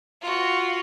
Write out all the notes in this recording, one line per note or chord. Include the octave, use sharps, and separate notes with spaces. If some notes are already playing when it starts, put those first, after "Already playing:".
F4 F#4